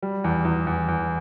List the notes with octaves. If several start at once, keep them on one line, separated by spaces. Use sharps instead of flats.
G3
E2
E2
E2
E2